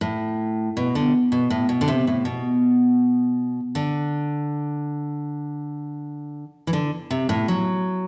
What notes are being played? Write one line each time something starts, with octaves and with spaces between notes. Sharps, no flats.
A2
B2
D3
B2
A2
B2
D3
C3
A2
B2
D3
E3
D3
C3
A2
F#3